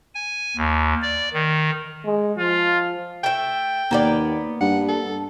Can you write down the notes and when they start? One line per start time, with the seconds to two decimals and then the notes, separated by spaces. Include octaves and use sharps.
0.15 G#5
0.57 D#2
1.02 D5
1.34 D#3
2.05 G#3
2.38 F3 F4
3.24 A3 E5 G5
3.91 D#2 A#3 B3 D5
4.61 G2 F#5
4.89 A4